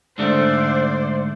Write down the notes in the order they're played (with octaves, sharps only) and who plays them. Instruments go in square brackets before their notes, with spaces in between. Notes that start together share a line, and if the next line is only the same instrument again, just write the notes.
[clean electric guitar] G#2 D3 A3 [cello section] C5 D5